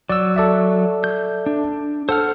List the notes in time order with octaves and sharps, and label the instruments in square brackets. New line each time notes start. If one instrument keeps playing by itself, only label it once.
[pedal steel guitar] F#3 [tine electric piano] D5 E6
[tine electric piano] A4 D5 E5
[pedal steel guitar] G6
D4
[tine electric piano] A4 [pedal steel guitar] C5 F#5 F6